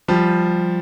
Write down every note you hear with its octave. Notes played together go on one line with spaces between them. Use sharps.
F3 G3